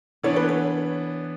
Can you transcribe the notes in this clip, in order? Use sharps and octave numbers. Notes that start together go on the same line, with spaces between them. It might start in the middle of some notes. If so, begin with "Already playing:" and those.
E3 B3 D4 C#5
B4
C#5